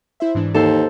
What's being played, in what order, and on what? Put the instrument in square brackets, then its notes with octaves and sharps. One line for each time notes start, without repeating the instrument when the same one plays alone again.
[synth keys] E4 C5 E5
G#2 E3 D4
[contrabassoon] D#2 [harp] A4 C5